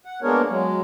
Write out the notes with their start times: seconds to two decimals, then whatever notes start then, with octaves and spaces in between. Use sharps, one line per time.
0.05 F#5
0.22 G#3 A#3 B3 D4 A#4 C#5
0.49 F#3 G#3